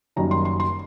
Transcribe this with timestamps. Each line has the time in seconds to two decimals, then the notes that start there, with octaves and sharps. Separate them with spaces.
0.16 F#1 F#2 D#3 G3 A#5
0.31 C6
0.45 C6
0.60 C6